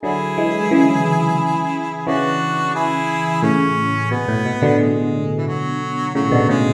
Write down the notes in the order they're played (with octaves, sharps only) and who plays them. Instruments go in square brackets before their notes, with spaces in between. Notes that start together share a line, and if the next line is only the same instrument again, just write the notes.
[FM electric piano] D3 F#3 [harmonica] E4 G#4
[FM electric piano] E3 G#3
C#3 E3
[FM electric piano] C#3 E3 [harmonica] D4 F#4
[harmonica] E4 G#4
[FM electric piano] A2 C#3 [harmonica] C#4
[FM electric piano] B2 [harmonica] B3
[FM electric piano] A2
B2
B2 D3
[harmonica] G#3
E3
F#3
[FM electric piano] A2 C#3 [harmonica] F#3
[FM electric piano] B2 D3
[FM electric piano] A2 C#3 [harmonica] G#3